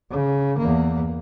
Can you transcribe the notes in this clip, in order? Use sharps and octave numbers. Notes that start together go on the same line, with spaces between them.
C#3
E2 A#3